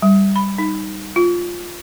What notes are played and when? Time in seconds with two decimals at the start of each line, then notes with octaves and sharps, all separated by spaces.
0.02 G3
0.36 B5
0.58 D#4
1.16 F4